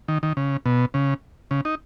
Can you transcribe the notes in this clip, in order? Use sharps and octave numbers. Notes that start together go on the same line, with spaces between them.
D#3
D#3
C#3
B2
C#3
C#3
D#4